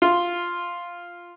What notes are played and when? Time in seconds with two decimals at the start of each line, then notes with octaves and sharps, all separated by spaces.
0.02 F4